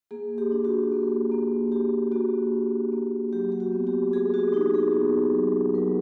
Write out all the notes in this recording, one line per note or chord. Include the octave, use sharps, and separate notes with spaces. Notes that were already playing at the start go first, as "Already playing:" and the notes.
A#3 G#4
G4
D4
F#4
A#3
A#3
F#4 G4
A#3 F#4
D4
A#3
F#3 G4
G4
F#4
B3
G4
F#4 G#4
F#4
D#4 G4
G#4
B3
F#3
F#3 A#4